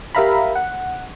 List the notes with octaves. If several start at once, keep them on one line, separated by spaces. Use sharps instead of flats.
G4 A#4 E5 F5 A#5 B5
F#5